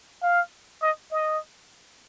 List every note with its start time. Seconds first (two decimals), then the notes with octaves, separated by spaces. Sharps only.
0.23 F5
0.82 D#5
1.11 D#5